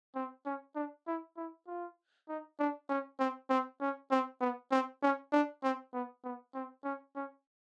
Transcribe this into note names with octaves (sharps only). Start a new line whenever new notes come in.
C4
C#4
D4
E4
E4
F4
D#4
D4
C#4
C4
C4
C#4
C4
B3
C4
C#4
D4
C4
B3
B3
C4
C#4
C#4